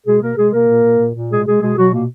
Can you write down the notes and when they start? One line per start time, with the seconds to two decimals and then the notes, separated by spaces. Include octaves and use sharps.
0.06 B2 G#3 G#4
0.21 B2 A#3 A#4
0.36 B2 G#3 G#4
0.52 B2 A#3 A#4
0.68 A#2
0.84 A#2
1.00 A#2
1.15 A#2
1.30 B2 G#3 G#4
1.46 B2 G#3 G#4
1.61 B2 G#3 G#4
1.77 B2 F#3 F#4
1.93 A#2 A#3